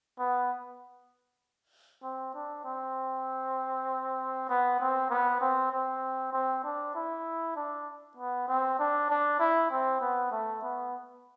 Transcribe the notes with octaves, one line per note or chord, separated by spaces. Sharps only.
B3
C4
D4
C4
B3
C4
B3
C4
C4
C4
D4
E4
D4
B3
C4
D4
D4
E4
C4
B3
A3
B3